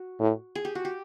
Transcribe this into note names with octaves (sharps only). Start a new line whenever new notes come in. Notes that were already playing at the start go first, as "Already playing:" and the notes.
Already playing: F#4
A2
G#4
G4
F#4
G4